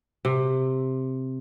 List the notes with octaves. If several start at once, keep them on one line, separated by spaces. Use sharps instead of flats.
C3